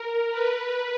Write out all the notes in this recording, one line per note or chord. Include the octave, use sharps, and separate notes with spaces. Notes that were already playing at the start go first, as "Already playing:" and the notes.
Already playing: A#4
B4